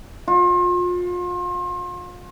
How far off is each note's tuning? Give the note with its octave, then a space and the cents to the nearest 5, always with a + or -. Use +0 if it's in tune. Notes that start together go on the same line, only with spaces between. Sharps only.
F4 +35